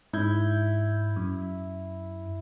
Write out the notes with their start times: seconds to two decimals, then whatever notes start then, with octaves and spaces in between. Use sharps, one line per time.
0.13 G#2 E4 G6 G#6
1.16 F#2